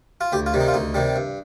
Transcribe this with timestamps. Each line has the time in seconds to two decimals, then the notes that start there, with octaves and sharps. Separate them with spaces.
0.21 F4
0.32 D2 G4
0.46 F4
0.54 C3 D#3 G3
0.60 D#4
0.68 F4
0.74 D2 D#4
0.94 C3 D#3 G3
1.16 G2